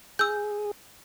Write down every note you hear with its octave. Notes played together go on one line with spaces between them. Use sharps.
G#4 E6 G6